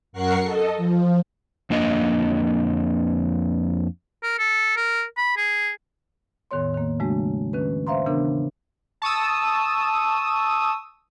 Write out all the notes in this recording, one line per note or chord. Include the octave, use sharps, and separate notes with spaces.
F#2 A#4 F#5 C#6 F#6 C7
A4 D#5
F3
F2 A#3 D4 D#5
A#4
A4
A#4
B5
G#4
E2 A2 D#3 B3 C#5 C6
D#3 A#3
C#3 F3 G#3 A3 D4 F#4
D#3 C#4 B4
C5 E5 F5 A#5 C6
C#3 E3 B3 D4 A#4
A5 C#6 D#6 E6